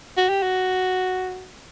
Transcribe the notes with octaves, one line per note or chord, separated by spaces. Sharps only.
F#4
G4
F#4